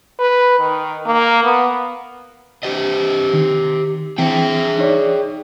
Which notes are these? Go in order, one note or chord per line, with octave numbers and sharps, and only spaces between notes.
B4
D#3
A#3
B3
G4 C5 D#5
D#3
E3 C4 G#4 E5 G5
D#4 C#5 D5